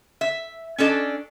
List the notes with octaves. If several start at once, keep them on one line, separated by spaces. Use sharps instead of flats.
E5
C#4 D4 A4 D#5